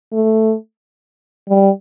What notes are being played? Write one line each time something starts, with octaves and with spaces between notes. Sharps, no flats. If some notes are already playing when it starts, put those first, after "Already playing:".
A3
G3